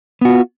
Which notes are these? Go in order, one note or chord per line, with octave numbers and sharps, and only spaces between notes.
B3 F4 F#4